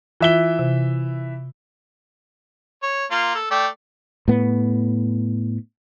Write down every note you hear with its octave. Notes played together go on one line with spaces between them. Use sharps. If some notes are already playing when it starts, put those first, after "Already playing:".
E3 F4 E5 G7
C3
C#5
A#3 F4
A4
A3 D5 G5
A2 B3